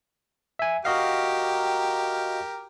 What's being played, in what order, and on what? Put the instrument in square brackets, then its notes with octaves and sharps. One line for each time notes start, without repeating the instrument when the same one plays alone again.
[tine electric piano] E5 G#5
[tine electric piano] F#4 D#5 F5 [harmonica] G4 A#4